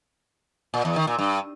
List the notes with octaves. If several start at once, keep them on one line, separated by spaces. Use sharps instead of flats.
A#2
E2
D#3
A#2
G2